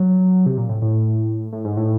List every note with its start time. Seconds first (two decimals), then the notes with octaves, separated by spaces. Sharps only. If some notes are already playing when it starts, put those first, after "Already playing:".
Already playing: F#3
0.46 C3
0.57 A#2
0.69 A2
0.82 A2
1.53 A2
1.65 G#2
1.77 A2